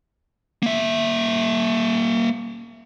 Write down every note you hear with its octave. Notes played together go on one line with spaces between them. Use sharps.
A#3 E5